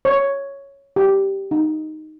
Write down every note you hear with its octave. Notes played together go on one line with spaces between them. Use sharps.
C#5
G4
D#4